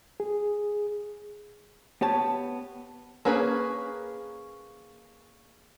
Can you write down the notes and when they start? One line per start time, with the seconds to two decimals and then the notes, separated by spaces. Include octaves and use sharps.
0.20 G#4
2.01 B3 G4 C#5 A5
3.25 A#3 C#4 G#4 B4